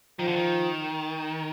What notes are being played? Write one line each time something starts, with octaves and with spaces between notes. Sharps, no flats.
D#3 F3
D3
D#3